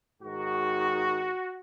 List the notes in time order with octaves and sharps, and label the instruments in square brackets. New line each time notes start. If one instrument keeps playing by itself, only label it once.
[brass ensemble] G#2 D#3 F#4